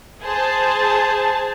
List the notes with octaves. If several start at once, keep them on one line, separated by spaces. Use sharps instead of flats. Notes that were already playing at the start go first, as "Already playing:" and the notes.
G#4 C5 A5